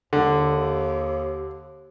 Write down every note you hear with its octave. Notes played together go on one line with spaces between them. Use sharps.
D#2 D3